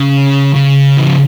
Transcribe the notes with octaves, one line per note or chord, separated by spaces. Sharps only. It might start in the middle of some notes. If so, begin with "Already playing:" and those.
Already playing: C#3
C#3
E3
F3